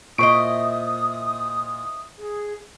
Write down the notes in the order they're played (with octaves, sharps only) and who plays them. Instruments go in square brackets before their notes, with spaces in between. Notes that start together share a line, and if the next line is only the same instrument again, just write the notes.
[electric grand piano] A#2 [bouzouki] E4 C5 D#5 [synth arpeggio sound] C#6 D7 [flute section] D#6
[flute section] G#4